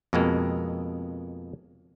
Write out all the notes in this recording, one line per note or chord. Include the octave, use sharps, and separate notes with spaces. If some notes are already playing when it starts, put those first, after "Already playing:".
F2 B2 G#3 A#3